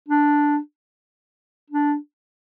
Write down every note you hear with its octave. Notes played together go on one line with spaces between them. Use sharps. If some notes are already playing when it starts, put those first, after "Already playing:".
D4
D4